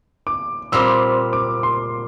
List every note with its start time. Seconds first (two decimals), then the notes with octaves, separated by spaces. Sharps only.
0.27 D6
0.72 A#2 G3 C4 E6
1.33 D6
1.63 C6